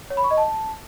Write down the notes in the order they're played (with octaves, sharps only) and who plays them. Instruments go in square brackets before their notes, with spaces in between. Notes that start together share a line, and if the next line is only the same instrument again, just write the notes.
[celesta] C#5
B5
C#6
D#5
A5